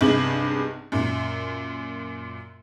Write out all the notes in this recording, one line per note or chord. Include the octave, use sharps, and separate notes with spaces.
B1 G2 C3 G#4 F#7
F#2 A#2